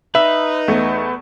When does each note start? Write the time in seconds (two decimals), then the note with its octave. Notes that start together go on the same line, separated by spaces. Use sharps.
0.15 D#4 B4 E5
0.68 E2 A3